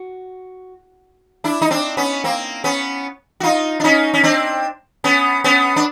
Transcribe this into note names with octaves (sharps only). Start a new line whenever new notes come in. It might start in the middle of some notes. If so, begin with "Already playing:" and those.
Already playing: F#4
D4 E4
D#4
C4 D4
B3 C#4
A#3 C4
B3 C#4
F#4
D#4 F4
D4
C#4 D#4
C#4
C4 D4
B3 C#4
B3 C#4
D4